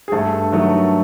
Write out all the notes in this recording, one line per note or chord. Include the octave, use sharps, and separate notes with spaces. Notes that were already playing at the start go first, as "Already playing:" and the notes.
G#4
G2 A3 A4
D#3 F#3 A3